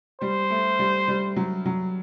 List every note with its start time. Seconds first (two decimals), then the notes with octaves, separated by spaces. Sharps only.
0.21 G3 C5
0.50 A3
0.79 G3
1.08 G3
1.36 F#3
1.66 F#3